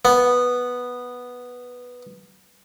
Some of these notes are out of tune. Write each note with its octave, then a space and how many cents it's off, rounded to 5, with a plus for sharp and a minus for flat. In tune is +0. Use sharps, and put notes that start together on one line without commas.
B3 -5